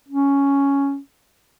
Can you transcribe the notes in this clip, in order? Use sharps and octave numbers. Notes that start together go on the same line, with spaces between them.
C#4